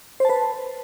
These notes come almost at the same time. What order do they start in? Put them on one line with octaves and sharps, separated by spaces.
C5 A5 B4